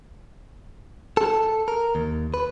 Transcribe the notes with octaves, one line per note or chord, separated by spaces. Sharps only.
A4
A#4
D#2
B4